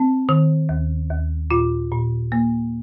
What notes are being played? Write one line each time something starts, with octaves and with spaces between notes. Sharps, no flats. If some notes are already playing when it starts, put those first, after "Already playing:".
Already playing: C4
D#3
D#2
D#2
A#2 F4
A#2
A#3